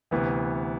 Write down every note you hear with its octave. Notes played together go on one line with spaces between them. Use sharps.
D2 C3 E3 B3